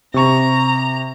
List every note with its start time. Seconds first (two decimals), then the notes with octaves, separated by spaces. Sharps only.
0.14 C3 A#5 C#6